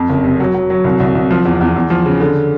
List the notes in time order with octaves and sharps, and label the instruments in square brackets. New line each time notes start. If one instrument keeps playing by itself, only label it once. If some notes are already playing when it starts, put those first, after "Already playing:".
Already playing: [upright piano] F2
F#1
C3
F#3
F#3
F#3
C2
C2
C2
F3
E2
E2
E2
F3
C#3
D3